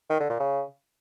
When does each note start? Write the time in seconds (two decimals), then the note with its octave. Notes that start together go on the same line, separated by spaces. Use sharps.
0.10 D#3
0.20 D3
0.30 A#2
0.40 C#3